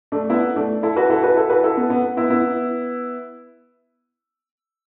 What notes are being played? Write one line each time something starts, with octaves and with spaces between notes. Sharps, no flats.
A3 D4
B3 E4
A3 D4
E4 A4
F#4 B4
E4 A4
F#4 B4
E4 A4
F#4 B4
E4 A4
B3
B3
B3 E4
B3 E4